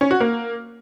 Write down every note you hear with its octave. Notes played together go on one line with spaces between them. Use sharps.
C#4
F#4
A#3